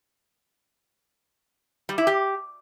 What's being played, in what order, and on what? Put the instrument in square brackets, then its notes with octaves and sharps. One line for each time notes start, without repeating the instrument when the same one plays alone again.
[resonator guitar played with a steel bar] G3
E4
G4